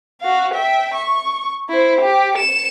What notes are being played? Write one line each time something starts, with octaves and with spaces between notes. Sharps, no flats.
F#4 F5
E5 G5
C#6
E4 C5
G4
C#7 E7